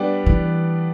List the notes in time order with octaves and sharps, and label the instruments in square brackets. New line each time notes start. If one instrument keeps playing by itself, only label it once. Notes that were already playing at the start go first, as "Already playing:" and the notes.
Already playing: [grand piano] G3 B3 D4
[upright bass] E3